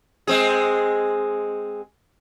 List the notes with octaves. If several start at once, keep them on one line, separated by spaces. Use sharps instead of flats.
G#3 C4 G#4